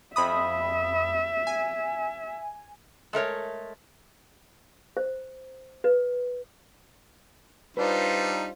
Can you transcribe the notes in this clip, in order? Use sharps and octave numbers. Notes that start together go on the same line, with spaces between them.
F2 E5 B5 D#6
G#5
G#3 A3 A#4 C#5
C5
B4
G3 D4 D#4 F4 B4 C5